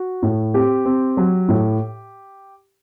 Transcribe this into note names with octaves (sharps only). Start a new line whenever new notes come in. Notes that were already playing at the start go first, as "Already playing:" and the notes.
Already playing: F#4
A2
C4 G4
C4
F#3
A2